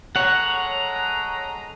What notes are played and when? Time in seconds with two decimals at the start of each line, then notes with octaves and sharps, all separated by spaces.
0.16 G#3 A4 C#5 F#5 A#5